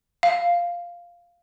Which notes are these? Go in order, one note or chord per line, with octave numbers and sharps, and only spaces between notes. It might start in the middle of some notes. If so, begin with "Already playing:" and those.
F5